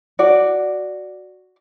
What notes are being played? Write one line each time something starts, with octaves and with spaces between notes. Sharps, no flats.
F#4 D5